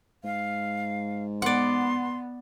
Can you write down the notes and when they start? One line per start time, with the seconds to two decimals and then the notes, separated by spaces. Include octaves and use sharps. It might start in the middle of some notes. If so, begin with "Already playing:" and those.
0.24 G#2 F5
1.42 B3 D5 F#5 C6